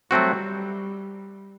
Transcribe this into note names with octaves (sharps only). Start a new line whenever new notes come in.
F#3 G3 A3 C4 F#4